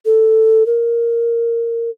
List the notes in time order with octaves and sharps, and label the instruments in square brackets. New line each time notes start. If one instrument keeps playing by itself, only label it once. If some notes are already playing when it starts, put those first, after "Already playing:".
[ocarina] A4
A#4